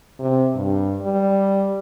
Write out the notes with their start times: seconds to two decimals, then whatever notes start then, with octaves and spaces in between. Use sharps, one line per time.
0.20 C3
0.55 G2
1.01 G3